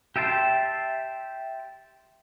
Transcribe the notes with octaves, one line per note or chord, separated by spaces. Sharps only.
G4 E5 G5 A5 C6